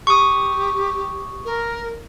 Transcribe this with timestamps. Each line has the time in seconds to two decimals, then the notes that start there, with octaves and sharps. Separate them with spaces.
0.07 G4 C#6 D#6
1.45 A#4